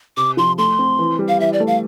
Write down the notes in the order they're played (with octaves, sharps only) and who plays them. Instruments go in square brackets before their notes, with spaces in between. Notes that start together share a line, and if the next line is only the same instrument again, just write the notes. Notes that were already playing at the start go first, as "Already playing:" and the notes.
[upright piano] C3 [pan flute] D6
[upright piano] F3 [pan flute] C6
[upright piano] A3 [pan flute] C6
[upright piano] C4
E3
G3
[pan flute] F5
[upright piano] E3 [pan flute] E5
[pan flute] D5
[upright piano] A3
[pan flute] F5